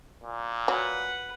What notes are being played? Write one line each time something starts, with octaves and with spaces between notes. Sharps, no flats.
A#2
F#3 B4 F#5